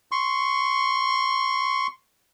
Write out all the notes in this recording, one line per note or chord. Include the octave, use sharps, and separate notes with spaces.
C6 C#6